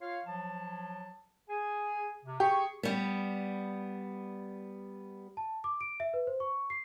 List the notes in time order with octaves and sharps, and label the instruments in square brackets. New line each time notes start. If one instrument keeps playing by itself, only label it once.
[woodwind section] F4 C#5 F5
F3 F#3 A5
G#4 G#5
C3
[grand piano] G4 [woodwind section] G#4 C#6
[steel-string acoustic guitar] G3 B3
[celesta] A5
D6
D7
E5
B4
C5
C#6
C7